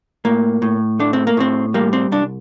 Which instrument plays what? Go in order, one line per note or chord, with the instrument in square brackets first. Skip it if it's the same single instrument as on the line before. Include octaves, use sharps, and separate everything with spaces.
[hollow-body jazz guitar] A2 A#3
A2
A3 D4
C4
A#3
A2 C4
G3 A#3
C4
C2 D4